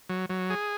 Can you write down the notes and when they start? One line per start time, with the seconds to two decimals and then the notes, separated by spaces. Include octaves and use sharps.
0.09 F#3
0.30 F#3
0.50 G#4